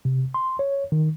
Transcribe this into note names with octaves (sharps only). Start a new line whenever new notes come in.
C3
C6
C#5
D#3